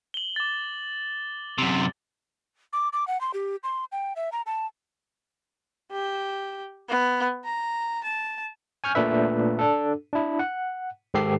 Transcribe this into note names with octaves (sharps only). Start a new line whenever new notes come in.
F#7 G7
D6 A6
F#2 C3
D6
D6
F#5
C6
G4
C6
G5
E5
A#5
A5
G4
B3
A#5
A5
G#5 C#6 F6 G6
A#2 A3 D4 B4 E5
D4 A4
D4 E4
F#5
G#2 D#3 G4 A4 C7